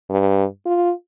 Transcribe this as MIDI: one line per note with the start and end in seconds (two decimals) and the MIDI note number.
0.10 0.45 43
0.66 0.92 65